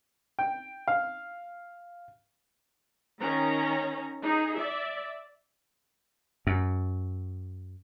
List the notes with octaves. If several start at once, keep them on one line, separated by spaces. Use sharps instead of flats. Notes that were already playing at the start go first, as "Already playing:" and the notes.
G5
F5
D#3 C#4 A#5
D#4 G#4
D5 E5
F#2